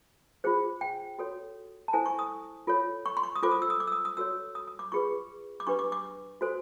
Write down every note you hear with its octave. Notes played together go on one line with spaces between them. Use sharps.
F4 G#4 C5
G5
F#4 A4 C#5
A5
E4 A4 C5 G#5
C#6
D#6
F4 A4 C#5
C#6
C6
C#6
D#6
F4 A4 C5 D6
D#6
E6
D#6
D6
E6
D#6
D#6
F#4 A4 C#5 E6
D#6
D#6
D6
F4 G#4 B4 C#6
D6
D4 G4 B4 C#6
D6
D6
F#4 A4 C5